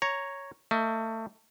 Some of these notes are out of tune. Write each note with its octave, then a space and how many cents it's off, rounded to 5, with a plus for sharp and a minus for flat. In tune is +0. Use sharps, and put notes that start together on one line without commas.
C#5 +0 A#5 +0
A3 +30 D#5 +35